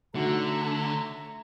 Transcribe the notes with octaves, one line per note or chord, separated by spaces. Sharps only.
D3 A3 D#4 F#4 C#5 E5 F#5 A#5